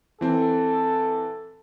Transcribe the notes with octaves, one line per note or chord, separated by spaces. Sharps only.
E3 C4 A4